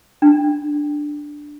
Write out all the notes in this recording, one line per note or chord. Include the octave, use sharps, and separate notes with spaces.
D4